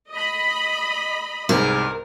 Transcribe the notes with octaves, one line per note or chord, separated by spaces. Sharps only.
D#5 B5
C2 G#2 A#4